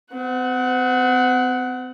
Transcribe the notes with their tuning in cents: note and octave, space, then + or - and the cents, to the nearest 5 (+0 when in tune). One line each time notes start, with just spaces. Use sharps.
C4 -40 F#5 +0